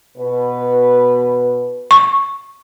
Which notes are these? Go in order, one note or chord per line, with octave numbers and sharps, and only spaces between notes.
B2 B4
C#6